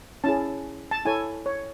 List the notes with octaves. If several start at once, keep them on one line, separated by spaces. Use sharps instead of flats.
C#4 E4 G#4 A5
A5
E4 A4 C#5 G#5
C#5